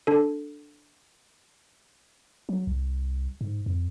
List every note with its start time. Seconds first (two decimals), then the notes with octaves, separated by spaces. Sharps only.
0.07 D4 A4
2.49 F#3
2.67 C2
3.41 G#2
3.66 F2